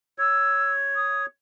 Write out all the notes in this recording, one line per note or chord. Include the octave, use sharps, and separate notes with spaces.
C#5 E6
D#6